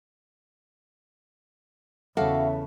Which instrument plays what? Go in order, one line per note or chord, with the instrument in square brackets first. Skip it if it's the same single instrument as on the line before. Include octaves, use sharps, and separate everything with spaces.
[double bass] E2 C#3 [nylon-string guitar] C#4 A4 [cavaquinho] F#4 F5 D6 [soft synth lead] E5